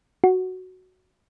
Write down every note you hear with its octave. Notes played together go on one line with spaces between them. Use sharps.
F#4